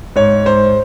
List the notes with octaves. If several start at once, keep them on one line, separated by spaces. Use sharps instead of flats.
G#2 C#5
G#2 C5